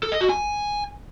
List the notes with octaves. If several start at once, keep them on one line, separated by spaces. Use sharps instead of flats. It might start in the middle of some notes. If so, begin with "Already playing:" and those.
A4
D#5
F#4
G#5